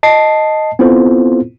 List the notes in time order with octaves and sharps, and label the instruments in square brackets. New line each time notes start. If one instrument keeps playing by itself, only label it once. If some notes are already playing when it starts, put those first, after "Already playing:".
[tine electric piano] D#5 A5 C7
B3 C4 E4 F4 A4 C5